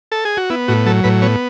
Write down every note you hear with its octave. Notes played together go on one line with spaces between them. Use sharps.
A4
G#4
F#4
B3 E4
A2 F#4
F#3 A4
A2 B4
B3 C#5